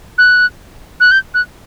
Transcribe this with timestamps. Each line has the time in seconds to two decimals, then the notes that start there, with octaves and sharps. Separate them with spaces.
0.18 F#6
1.00 F#6
1.11 G6
1.34 F#6